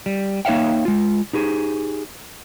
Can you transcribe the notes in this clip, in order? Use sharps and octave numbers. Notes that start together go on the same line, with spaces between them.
G3
A#3 D#4 C#5 E5 F5 G5
G#3 F4
D#4 G4 G#4